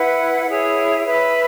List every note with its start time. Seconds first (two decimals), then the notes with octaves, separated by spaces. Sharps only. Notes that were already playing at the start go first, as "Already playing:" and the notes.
Already playing: E4 B4 F#5
0.47 E4 G#4 C#5
1.05 B4 E5 B5